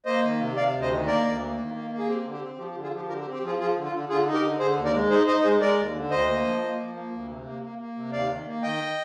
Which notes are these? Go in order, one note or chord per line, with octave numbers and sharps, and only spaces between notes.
A#3 C5 D#5
D#3
C3
C3 D5 F5
D2
C5 D#5
D#3
A#3 A#4 D5
D2
A#3
D#3
A#3
A#3
G#4
C4 G4
D3
G4
C4
F3 G4
G4
D3
F4 G#4
F3 G4
D3 G4 A#4
G4
C4
G4
F3 F4 G#4
F3 F4 G#4
D3
F4
D3
D3 F4 G#4
D#4
G4 A#4
D3
D3 G#4 C5
D#2
A#4 D5
G#3
D#4 G#4 C5
D#4 C5 D#5
G#3 G#4 C5
G#3 A#4 D5
D#2
D3
D2 C5 D#5
A#3
F3
A#3
F3
A#3
D2
C3
A#3
A#3
A#3
C3
D#2 D5 F5
D#3
A#3
D#3 D#5 G5